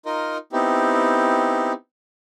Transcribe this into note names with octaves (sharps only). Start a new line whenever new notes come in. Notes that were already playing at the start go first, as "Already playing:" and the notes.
D#4 F4 A#4 D#5
B3 C4 D#4 E4 G4